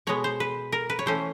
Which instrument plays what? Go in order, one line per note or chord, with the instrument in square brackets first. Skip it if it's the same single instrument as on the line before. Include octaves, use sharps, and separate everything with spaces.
[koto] B2 G#3 B3 C#5
C5
B4
A#4
B4
C#5
E3 A3 C#4 C5